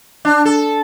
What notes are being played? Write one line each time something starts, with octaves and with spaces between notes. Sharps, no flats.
D4
A4